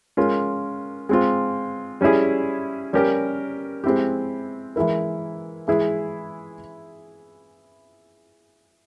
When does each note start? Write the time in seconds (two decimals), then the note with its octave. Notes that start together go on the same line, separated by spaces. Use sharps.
0.17 G#3 C#4 F4 A#4
1.09 G#3 C4 F4
2.01 G3 C#4 E4 G#4
2.93 G3 C#4 G4 A#4
3.84 G#3 C4 E4 G4
4.76 E3 G#3 E4 A#4
5.68 E3 G#3 E4 G#4